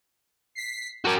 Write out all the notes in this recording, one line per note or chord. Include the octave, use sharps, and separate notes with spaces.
B6 C7
F#4 A#4 G5 A5 D6